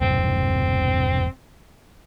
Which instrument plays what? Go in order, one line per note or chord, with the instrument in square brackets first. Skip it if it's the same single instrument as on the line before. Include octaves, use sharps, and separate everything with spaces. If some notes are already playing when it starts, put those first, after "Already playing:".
[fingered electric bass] E1 G2 C3 [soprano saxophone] C4